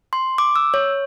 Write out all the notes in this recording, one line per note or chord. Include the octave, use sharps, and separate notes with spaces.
C6
D6
E6
C#5